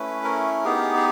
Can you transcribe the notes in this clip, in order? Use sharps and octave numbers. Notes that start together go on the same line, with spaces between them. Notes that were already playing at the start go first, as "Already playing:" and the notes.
Already playing: A3 C#4 E4 B4
A#4
B3 D#4 G4 G#4
G#4